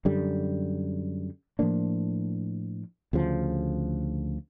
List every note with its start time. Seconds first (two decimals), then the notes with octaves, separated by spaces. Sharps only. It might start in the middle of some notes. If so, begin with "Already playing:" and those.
0.05 F#2 D3 G3
1.59 A2 F3 A#3 D4
3.13 D2 C#3 F3